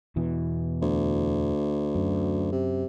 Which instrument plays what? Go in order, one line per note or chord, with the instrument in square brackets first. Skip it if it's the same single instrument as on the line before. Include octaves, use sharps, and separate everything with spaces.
[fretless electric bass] E2 B2 E3
[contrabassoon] D2
[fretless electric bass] F#2
[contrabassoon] C3